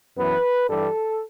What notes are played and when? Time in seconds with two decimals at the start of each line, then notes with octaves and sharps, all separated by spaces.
0.17 F#2 E3 B3 B4
0.68 G2 E3 G3 A4